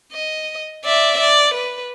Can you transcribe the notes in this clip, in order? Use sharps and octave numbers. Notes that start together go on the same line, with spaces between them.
D#5
D5 E5
D5
B4